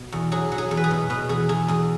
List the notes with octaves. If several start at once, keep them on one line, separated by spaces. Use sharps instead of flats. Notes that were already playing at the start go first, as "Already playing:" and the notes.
Already playing: B2
E2
F#3 G#4
F#3
G#4
E2
B4
G#4
B2
B2 B4
E2 G#4
E2 G#4
E2 G#4